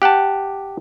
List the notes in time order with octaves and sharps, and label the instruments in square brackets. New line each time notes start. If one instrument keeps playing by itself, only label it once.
[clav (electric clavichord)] G4 F#5 G5 A5